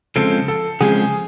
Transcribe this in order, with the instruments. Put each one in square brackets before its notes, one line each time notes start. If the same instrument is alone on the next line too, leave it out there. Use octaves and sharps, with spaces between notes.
[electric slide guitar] C#3 F3 G#3 C4 [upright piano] A4
[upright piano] A4
[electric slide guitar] C#3 F3 G#3 C4 [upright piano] G#4